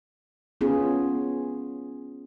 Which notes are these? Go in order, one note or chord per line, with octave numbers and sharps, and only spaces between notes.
B3 C#4 F4 G#4